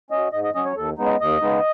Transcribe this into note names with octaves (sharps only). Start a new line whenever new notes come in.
F#3 C#4 D#5
G#2 D#5
D#5
F#3 C#4 D#5
C#5
D#2 A4
C#3 G#3 B3 D#4
D#5
D#2 D#5
C#3 G#3 B3 D#4